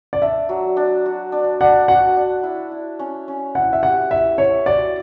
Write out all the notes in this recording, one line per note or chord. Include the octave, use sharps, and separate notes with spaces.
D5
D4 E5
F#3
D4
F#4
D4
D4 F#5
F#4 F#5
D4
E4
E4
C#4
C#4
E4 F#5
E5
G4 F#5
E4 E5
E4 C#5
F#4 D5